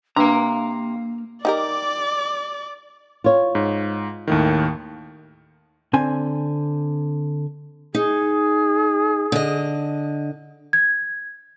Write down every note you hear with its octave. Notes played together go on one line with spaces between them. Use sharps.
C3 A#3 D4 B4 F5 A#5
D#4 G4 A#4 D5 D6
F4 C#5
G#2
D#2 A2 D#3
D3 C4 G#5
D#4 G#4
D3 D#5
G#6